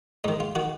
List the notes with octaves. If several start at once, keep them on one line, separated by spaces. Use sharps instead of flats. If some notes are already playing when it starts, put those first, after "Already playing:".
G#2 D#3 D#4
F4
D#3 F#4